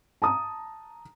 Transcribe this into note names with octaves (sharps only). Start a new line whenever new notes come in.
A5 A#5 D#6